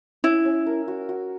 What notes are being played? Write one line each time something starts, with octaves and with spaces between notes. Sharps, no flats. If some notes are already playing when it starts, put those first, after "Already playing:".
C#4 E4
C#4
A#4
F#4
F#4